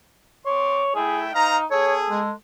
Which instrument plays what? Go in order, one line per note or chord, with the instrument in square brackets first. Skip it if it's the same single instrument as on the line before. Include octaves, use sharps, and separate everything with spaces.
[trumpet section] C4 C6 D6 [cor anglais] C#5
[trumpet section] A3 E5 G5 [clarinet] E4 [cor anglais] G#4
[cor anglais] D#4 [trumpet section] C5 A#5 [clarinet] F5
[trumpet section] B3 G#4 [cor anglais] A4 [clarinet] C#5
[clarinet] G#3